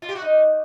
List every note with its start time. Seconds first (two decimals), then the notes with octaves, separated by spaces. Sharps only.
0.02 F4
0.09 G4
0.15 F#4
0.22 D#4